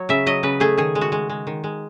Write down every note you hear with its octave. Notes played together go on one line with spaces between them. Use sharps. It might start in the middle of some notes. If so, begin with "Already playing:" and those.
Already playing: F#3 C#5
C#3 E5
F#3 D#5
C#3 B4
A3 G#4
D#3 G#4
G#3
F#4
G#3
G#3
D#3
G#3